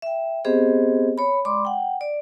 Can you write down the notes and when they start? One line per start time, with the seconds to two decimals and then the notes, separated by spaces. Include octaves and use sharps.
0.02 E5 G5
0.44 B3 C4 G4 G#4 C5 D#5
1.18 C#5 B5
1.45 G#3 D5 B5 C6 D6
1.65 F#5 G5
2.01 D5